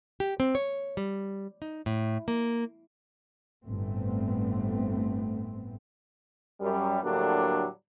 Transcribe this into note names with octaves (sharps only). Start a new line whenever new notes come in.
G4
C4
C#5
G3
D#4
A2
A#3
G1 A2 A3 B3 C4
F#2 G3
A2 D3 F#3 G3 A#3 D4